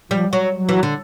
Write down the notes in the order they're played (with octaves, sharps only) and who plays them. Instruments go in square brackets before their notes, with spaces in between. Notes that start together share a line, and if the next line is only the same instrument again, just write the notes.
[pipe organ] F3 [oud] G3
[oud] F#3
[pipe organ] F#3
[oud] E3
D3